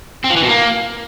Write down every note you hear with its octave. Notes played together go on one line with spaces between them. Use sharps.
C4
F3
E3
B2
A#3